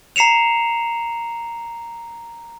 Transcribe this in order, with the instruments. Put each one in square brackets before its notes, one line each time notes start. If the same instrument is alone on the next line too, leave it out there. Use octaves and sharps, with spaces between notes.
[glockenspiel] A#5 C7 C#7 E7 F7